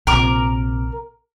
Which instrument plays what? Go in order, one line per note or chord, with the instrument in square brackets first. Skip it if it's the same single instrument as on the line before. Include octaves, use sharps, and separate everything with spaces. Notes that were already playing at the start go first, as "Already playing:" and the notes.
[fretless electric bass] A#1 C3 [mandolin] A#4 D6